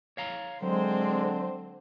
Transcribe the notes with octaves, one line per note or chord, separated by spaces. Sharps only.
C#5 F5 A#5
D3 F#3 G#3 C4 C5